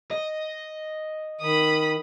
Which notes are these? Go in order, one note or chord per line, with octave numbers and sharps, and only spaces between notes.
D#5
D#3 B5 D#6